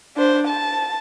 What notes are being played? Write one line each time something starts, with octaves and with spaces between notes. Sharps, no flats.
D4 C5
A5